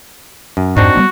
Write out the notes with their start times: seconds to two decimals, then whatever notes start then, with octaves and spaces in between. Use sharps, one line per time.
0.57 F#2
0.77 F2 G#2 C4 D4 D#4 F#4
0.95 G3 G#3 B3